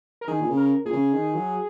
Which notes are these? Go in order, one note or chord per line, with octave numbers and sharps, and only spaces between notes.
A#4
D#3 G#4
A#2
C#3
A#4
A#2 G#4
C#3
D#3
F#3